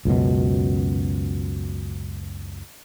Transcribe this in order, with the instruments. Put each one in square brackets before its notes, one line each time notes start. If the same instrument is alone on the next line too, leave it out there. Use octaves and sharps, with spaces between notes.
[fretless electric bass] C#2 F#2 B2